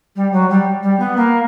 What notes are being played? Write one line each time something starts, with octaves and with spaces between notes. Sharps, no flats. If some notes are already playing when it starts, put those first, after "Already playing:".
G3
F#3
G3
G3
B3
A#3